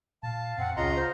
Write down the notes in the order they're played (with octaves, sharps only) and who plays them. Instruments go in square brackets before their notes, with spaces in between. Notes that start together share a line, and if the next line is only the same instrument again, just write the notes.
[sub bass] A#2 [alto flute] F5 [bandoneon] A5
[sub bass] F2 [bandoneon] C4 [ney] F#5
[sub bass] C#2 [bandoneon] C#3 A#5 C6 [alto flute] F4 [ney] D#5
[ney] C5